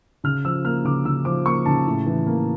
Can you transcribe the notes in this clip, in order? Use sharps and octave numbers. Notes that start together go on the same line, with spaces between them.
C#3 F6
F3 E6
A#3 F6
C#3 D6
C#3 E6
F3 D6
A#3 C#6
C#3 A5
A2
E3
A#3